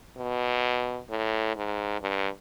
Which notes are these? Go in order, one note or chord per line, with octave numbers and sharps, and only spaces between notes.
B2
A2
G#2
G2